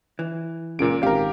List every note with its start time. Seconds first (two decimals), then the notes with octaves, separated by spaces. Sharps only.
0.19 E3
0.79 C#2 A#2 A#3 D7
1.03 G#1 G4 A#4 F5